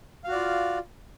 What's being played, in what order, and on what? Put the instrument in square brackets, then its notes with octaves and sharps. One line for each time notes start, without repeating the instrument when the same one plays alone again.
[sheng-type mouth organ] F5
F#4
D5
F4